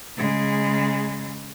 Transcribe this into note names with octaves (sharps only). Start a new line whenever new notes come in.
C#3 G#3